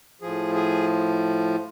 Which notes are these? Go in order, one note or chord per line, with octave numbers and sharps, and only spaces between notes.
A2 F3 G#4
G#4